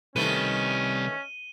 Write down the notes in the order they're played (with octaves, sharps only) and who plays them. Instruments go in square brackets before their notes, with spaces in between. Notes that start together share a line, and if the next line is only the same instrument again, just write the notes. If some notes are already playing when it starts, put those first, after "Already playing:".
[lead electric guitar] C3 G3 [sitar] D#3 A3 B4 [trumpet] C#4 [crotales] D#7 G7